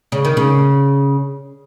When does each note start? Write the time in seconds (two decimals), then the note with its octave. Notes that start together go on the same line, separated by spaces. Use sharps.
0.12 C#3
0.25 D#3
0.37 C#3